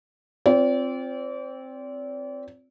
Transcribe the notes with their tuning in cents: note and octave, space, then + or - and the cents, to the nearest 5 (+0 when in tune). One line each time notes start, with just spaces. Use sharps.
C4 +0 F4 +0 D5 -35